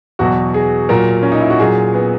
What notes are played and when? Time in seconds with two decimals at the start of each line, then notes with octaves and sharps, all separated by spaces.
0.19 E2 B2 F#3 F#4
0.54 G#4
0.89 A#2 F#3 A#4
1.23 C#4
1.32 D#4
1.41 E4
1.50 F#4
1.60 A#2 F#3 G#4
1.94 B3